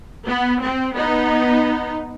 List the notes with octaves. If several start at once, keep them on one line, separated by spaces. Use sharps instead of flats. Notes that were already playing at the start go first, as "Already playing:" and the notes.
B3
C4
B3 D#4